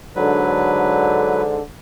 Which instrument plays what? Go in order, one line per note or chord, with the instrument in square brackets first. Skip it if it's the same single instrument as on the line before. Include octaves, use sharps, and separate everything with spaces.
[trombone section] G#2 D3 [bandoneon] F#3 B4